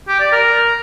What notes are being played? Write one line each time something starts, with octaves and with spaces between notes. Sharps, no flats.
G4
D5
A#4